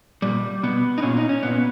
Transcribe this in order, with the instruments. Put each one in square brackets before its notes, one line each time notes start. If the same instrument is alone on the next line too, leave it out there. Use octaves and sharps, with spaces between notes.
[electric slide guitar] A#2 G3
B2 B3
D#4
A#2 C#4
D#4
C#4
A#2 B3